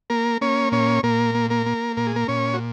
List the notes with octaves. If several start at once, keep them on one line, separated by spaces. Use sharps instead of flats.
A#3 A#4
A#3 C#4 C#5
A#2 C#4 C#5
A#2 A#3 A#4
A#3
A#3 A#4
A#3
A#2 A#4
G#4
A#3 A#4
A#2 C#4 C#5
F#4